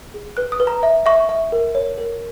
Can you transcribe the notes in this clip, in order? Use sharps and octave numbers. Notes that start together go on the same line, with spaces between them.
G#4
B4 F#6
D#6
B4
A#5
E5
E5 C#6
E5
A#4
C#5
A#4